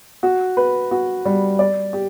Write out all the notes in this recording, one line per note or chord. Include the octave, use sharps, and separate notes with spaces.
F#4
B4
F#4
G3
D5
G4